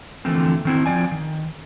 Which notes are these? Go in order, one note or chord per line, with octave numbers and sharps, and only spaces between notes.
D3 E3 F3 A3 A#3 C4
D#3 C4 E4
F3 C4 D5 G#5
D#3